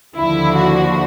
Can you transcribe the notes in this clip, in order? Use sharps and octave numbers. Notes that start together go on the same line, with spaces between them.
D#2 D3 F3 E4
F#4